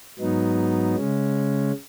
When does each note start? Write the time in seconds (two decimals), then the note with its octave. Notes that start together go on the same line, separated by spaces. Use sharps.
0.19 G#2 F#3 B3 D#4
0.95 C#3 G#3 C#4